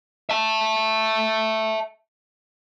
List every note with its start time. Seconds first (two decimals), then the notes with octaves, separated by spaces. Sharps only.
0.30 E5 A5